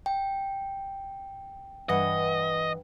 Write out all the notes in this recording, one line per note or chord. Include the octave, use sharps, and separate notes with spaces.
G5
G2 E3 D#5 F#5